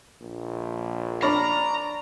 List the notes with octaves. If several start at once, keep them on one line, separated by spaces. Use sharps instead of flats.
A#1
D4 D5 A#5 B5 C#6 F6